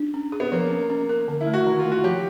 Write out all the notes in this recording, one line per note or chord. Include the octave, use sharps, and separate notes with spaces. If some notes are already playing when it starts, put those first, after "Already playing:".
Already playing: D4
C#4
G#4
B3
F3 A#3
C#4
C#4
A#4
D3
E4
A3
F#4
D#3 E4
F4
A3
F#4
F3 G4